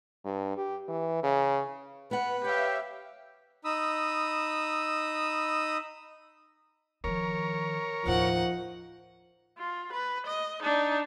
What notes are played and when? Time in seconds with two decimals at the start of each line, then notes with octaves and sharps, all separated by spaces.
0.25 G2
0.57 G4
0.88 E3
1.23 C#3
2.11 B3 B4 F#5
2.44 G4 C#5 E5 F5 G5
3.65 D#4 B5 D#6 E6
7.04 D#3 F3 A#4 C#5
8.05 D#2 A2 F3 D#4 F#5
9.58 F4
9.93 B4
10.27 D#5
10.63 D4 D#4